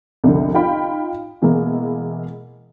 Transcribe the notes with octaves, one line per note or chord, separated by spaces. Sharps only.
C2 F2 D3
D#4 F4 F5 G5 B5
B2 E3 G#3 A#3